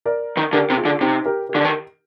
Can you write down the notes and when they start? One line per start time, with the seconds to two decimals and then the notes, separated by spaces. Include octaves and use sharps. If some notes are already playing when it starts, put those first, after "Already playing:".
0.06 A#4 D5
0.37 D#3
0.53 D3 G4 A#4
0.70 C3
0.77 F4 G#4
0.85 D3
1.01 C3 D#4 G4
1.25 G4 A#4
1.49 G4 A#4
1.55 D3
1.65 D#3